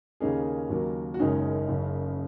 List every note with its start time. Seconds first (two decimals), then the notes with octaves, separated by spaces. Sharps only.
0.20 D#2 C#3 A#3 C#4 D#4 G#4
0.70 D#2 C#3 F#3 A#3
1.14 F#4
1.19 F#1 F#2 D#3 G#3 C#4 D#4
1.68 F#1 F#2 C#3